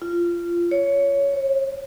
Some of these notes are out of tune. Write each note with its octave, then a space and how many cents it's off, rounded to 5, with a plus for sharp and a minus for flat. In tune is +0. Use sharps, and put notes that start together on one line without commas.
F4 -20
C#5 +15
C#5 -40